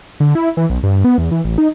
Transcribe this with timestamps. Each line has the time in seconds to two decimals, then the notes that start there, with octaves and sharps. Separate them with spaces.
0.20 D3
0.35 E4
0.57 E3
0.70 B1
0.83 G2
1.04 B3
1.18 E2
1.31 E3
1.45 A1
1.58 D#4